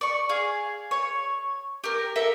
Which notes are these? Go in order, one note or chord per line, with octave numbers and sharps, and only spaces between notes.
D5 C#6
G#4 F5
C#5
G4 A#4
A4 A#4 E5